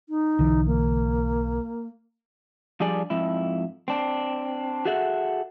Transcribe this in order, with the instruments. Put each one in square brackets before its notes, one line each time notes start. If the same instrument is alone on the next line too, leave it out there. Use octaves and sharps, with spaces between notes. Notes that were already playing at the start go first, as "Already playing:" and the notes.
[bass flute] D#4
[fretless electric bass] B1 D3 E3
[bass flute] A#3
[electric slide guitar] F3 G3 D4 G#4 D5
F2 G#2 E4
C4 D4
F#4 G#4 A4 E5 F#5